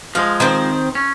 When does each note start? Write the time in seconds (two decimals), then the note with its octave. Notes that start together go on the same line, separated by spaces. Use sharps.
0.15 F3 G#3 F5
0.40 D#3 C4 C5
0.95 C#4